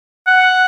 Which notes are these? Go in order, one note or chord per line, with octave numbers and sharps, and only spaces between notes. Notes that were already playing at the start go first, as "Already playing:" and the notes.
F#5